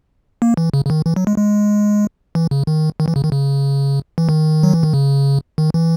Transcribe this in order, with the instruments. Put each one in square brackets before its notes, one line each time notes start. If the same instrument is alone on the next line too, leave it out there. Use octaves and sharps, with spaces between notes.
[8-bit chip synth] A#3
E3
C#3
C#3
D#3
E3
F#3
G#3
G#3
E3
C#3
D#3
D#3
E3
C#3
D#3
C#3
E3
D#3
F#3
E3
D#3
C#3
D#3
E3